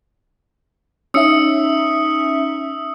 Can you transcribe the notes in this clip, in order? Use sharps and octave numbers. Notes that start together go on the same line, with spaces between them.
C#4 D#4 E5 D#6 E6 C#7